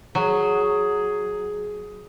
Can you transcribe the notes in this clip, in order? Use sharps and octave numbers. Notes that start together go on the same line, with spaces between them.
F#3 G#4